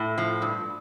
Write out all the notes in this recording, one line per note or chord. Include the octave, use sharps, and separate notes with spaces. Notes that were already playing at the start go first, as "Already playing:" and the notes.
Already playing: A2 A3
F3
G2